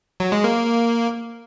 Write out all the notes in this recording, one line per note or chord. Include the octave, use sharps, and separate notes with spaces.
F#3
G#3
A#3